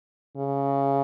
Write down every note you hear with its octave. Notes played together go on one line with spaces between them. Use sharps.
C#3